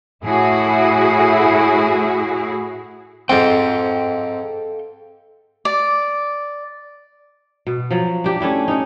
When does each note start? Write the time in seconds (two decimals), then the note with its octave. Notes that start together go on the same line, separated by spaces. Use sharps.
0.24 A2 E4 F#4 G#4
3.29 G#2 C4 A4 F5 G5
5.65 D5
7.67 B2
7.91 F3 F#3
8.24 D4 G4
8.41 A3 C#4 D4 E4
8.68 C#4 D#4